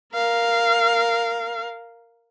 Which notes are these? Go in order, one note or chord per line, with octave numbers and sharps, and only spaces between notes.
A#4 F5